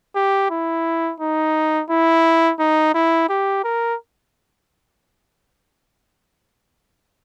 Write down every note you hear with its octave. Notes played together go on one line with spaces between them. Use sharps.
G4
E4
D#4
E4
D#4
E4
G4
A#4